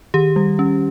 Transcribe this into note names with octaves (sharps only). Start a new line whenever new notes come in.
D#3 G4
G3
C#4